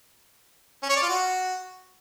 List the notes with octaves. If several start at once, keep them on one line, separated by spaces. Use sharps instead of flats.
C#4
C#5
D5
F4
F#4